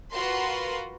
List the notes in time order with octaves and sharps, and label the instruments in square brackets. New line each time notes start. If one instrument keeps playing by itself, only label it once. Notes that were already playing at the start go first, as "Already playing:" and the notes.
[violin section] F4 F#4 A#4 B4 C6